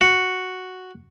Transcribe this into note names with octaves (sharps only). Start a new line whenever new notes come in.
F#4